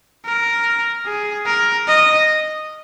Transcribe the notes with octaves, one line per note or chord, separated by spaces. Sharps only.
A#4
G#4
A#4
D#5